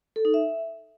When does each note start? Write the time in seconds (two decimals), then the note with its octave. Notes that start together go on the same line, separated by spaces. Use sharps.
0.16 A4
0.25 D#4
0.34 E5